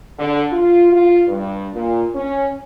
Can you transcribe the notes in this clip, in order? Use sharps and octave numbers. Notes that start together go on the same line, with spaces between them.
D3
F4
F4
G2
A#2
C#4